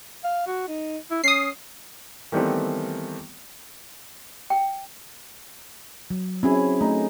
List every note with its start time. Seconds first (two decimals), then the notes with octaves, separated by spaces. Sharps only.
0.24 F5
0.47 F#4
0.68 D#4
1.10 E4
1.24 C#4 D#6 C7
2.32 D#3 E3 G3 A3 B3 C4
4.50 G5
6.10 F#3
6.43 C4 C#4 E4 F#4 G#4 E5
6.81 A3 D#4